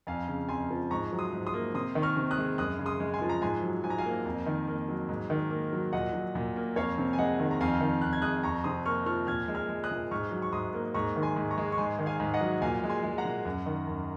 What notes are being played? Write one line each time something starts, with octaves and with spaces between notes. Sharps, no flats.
F2 F5 G#5
C#3
F2 G#5 C6
F3
G#2 A#5 C#6
F#3
C6 D#6
G#2
C6 D#6
A#3
C3 C6 D#6
D#3
C#6 F6
C3
D#6 F#6
G#3
F#2 D#6 F#6
C#3
C6 D#6
G#3
G#5 C6
F3
A#5
G#2 G#5 C6
F#3
G#2 G#5
A#5
F5 G#5
A#3
F2
D#3
A#3
F#3
G#2
D#3
A#3
F#3
A#2 D#5 F#5
F#3
A#2
A#3
F2 C#5 F5
C3
G#5
G#3 D#5 F#5
D#3
A#5
F2 F5 G#5
D#3
F2 F#6
G#6
G#3 D#6 F#6
F2 A#5 C#6
C3 C6 D#6
A#3 C#6 F6
F3 C#6 F6
A#2 F6 G#6
G#3
F6 G#6
G#3
D#6 F#6
A#2
G#2 C#6 F6
F#3
C#6
G#2 C6 D#6
A#3
G#2 A#5 C#6
D#3
G#5 C6
G#2
A#5 C#6
G#3
C#6
G#2 G#5 C6
D#3
F5 G#5
G#2
D#5 F#5
F#3
A#2 F5 G#5
G#3
G#5 C6
G#3
F#5 A#5
A#2
F#2
D#3
F#2